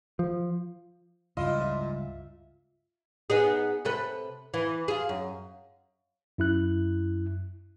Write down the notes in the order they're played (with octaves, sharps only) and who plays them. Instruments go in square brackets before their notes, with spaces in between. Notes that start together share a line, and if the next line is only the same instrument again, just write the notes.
[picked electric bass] F3
[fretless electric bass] C#2 G2 [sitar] A#2 E4 D#5 [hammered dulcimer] F4
[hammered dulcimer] E5
[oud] B3 D#4 G#4
C3 A4 B4
E3
F4 G#4
F#2
[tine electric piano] F#2 E4 F#6